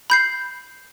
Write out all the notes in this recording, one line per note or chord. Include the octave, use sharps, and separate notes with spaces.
B5 G6 C7